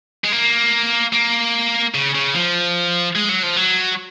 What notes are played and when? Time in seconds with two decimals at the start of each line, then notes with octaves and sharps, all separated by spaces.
0.24 G#3
0.32 A#3
1.13 A#3
1.94 C#3
2.15 C#3
2.35 F3
3.15 G#3
3.29 F#3
3.43 F3
3.56 F#3